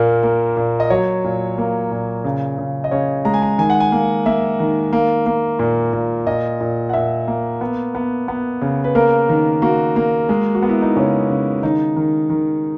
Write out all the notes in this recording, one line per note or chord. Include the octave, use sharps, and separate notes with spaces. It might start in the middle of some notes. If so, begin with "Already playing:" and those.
Already playing: A#2 A#3 A#4
A#3
A#2
D#5
F#3 C#5
A#2
A#3
A#2
C#3
C#3
D#5
C#3 C#5
G#3 A#5
G#5
A#5
D#3 G#5
F#5
G#5
A#3
A#3 E5
D#3
A#3
A#3
A#2
A#2
A#2 D#5
A#2
F#5
A#2 E5
A#3
B3
B3
B3
C#3
B4
A#3 A#4
D#3
A#3 F#4
A#3
G#3
F#4
B3
E4
D#4
C#3 C#4
C#3
D#3 D#4
D#3
D#3